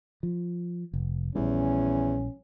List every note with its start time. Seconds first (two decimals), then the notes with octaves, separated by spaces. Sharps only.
0.23 F3
0.93 F1
1.35 A#1 E2 G3 C#4